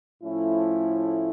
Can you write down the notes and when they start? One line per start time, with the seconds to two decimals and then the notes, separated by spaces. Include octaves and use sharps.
0.23 A2 F3 A3 C#4 E4